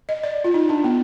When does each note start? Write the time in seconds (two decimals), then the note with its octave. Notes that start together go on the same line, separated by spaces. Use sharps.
0.09 D#5
0.24 D5
0.44 F4
0.54 D#4
0.69 D4
0.84 B3